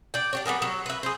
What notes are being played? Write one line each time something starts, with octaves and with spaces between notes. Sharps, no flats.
D5 G5
D4 G4 C#5
G3 B3 G#4 A#4
F#3
B4 E5
G#4 C5